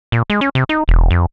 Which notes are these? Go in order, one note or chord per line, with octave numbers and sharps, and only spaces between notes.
A#2
G#3
C#4
C3
D#4
E1
F2